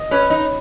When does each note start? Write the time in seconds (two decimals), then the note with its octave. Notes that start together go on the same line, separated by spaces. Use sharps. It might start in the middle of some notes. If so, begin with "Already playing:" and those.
Already playing: D#5
0.11 C#4 B4
0.30 D#4